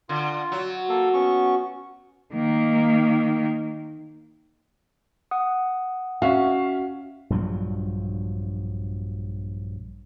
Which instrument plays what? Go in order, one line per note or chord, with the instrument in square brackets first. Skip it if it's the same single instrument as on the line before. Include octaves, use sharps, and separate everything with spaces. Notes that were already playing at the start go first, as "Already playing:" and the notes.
[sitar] D3 [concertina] F4
[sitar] F#3
[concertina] A#3 A4
B3 C#4 C#6
[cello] D#3 A#3
[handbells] F#5 D#6
[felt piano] C#4 E5 F5 [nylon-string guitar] F#4
[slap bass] A#1 G2 F3 F#3